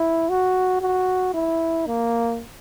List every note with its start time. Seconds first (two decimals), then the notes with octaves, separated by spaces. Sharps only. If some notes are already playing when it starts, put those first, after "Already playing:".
Already playing: E4
0.29 F#4
0.81 F#4
1.34 E4
1.86 A#3